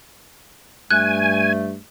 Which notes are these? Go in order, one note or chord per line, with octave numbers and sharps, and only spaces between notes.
G2 A3 G#5 F#6